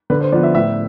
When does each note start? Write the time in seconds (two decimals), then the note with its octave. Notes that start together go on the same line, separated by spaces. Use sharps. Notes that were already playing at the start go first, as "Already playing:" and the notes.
0.10 D3 B4
0.21 C5
0.32 F3 B3 D5
0.43 E5
0.54 A2 E5